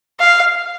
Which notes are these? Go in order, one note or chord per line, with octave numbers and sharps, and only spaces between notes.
F5